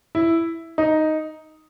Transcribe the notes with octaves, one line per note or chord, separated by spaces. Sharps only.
E4
D#4